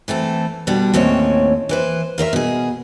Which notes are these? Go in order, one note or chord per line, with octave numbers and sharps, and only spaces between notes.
E3 A3 C4 A4
B2 D3 G3 D4
D#2 A2 C4 C#4 C#5
E3 B4 C5
F4 A#4 C5 E5
B2 G#4